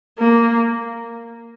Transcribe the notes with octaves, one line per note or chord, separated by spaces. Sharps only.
A#3